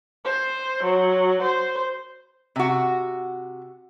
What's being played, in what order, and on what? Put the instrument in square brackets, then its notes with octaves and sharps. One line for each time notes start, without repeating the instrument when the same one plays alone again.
[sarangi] C5
F#3
C5
[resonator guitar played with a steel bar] C3 F#4